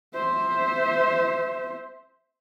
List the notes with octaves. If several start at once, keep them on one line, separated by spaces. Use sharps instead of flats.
C5 E5